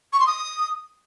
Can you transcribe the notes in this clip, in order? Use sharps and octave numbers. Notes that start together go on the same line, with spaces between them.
C#6
C6
D#6